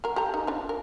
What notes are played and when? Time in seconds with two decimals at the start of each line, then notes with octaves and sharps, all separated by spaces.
0.04 F#3 A#4
0.16 G4 A4 A#5
0.34 D#4
0.47 F3 D4
0.69 A#4